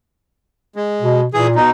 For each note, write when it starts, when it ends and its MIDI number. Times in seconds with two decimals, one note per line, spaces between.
0.76 1.21 56
1.02 1.26 47
1.34 1.59 46
1.34 1.47 52
1.34 1.47 68
1.55 1.70 47
1.55 1.70 63